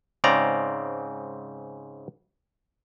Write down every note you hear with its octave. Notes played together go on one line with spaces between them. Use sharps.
G#2 C#3 C4 D5 A#5